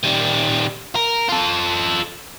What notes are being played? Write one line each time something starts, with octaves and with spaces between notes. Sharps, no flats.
D#3 G3
A#4
F4 A4